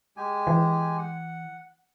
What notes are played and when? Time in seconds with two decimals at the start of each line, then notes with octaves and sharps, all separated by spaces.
0.17 G#3 G4 G#5
0.47 E3
0.98 F#5